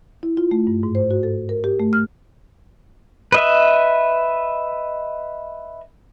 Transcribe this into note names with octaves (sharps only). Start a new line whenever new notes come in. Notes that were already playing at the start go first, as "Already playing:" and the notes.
E4
F4
A3
G2
G#2
C5
F#4
A4
A#4
G4
A3
F6
B4 D#5 E5